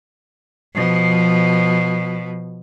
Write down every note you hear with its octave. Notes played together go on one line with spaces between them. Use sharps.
B2 F3